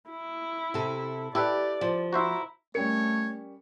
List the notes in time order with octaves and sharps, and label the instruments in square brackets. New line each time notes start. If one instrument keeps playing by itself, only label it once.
[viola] E4
[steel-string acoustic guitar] C3 A4
[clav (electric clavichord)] E4 A4 B4 [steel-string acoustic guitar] G4 [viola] D5
[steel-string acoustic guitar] F3
[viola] E4 A#5 [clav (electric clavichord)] F#4 C5 E5
[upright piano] G3 C#4 C#7 [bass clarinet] A3 [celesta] A#4 [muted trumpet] C#5